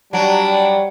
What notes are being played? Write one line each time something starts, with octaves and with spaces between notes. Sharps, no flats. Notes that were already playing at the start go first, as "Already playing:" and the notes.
F#3 G3 D4